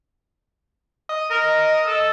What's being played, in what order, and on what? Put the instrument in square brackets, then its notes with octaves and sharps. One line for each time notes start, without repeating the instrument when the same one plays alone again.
[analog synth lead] D#5
[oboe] A#4 [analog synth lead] D#5
[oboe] A4